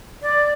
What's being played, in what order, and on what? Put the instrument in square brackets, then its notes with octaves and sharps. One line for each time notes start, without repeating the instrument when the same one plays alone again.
[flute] D5